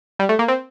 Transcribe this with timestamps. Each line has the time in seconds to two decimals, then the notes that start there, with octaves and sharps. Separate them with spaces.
0.19 G3
0.29 A3
0.39 A#3
0.48 C4